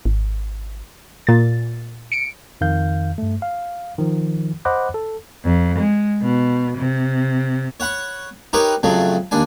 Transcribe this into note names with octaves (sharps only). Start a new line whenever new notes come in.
G#1
A#2 A6
C#7 D7
F2 D#3 F5 G6
G2 A3
F5
D#3 F3
C5 D#5 F#5 B5 D6 F#6
A4
F2
G#3
B2
C3
C#5 F#5 B5 C#6
D#4 G4 A#4 B4 C#5 D#5
F2 C#3 F#3 A3
D#2 D4 G#5